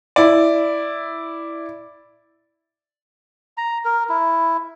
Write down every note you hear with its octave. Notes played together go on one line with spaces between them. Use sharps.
E4 D5
A#5
A#4
E4